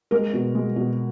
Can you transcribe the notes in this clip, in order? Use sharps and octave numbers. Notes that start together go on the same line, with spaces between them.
G#3 A#4
B2
G#3
B2